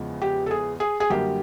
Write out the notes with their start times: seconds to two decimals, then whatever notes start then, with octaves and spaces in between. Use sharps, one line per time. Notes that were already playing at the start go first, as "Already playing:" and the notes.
Already playing: E2 C#3 F3 G#3
0.22 G4
0.46 A4
0.51 G#4
0.80 G#4
1.00 G#4
1.10 F#2 D3 G3 A#3 G4